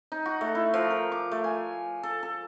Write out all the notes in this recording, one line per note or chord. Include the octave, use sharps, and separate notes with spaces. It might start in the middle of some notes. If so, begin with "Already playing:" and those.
D#4
F#4
A3
E4
F3
A#4
D6
A3
G#5
A4
A4